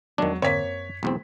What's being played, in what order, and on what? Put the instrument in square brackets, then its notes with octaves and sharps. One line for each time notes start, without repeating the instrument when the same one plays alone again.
[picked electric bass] E2 G#3 B3 [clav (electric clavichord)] D#3 D4 [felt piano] F#3
[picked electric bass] F2 G#2 D3 [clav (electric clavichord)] A#3 C4 [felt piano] C#5 B6
[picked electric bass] F#2
[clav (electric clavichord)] B1 E2 C4 [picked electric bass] A3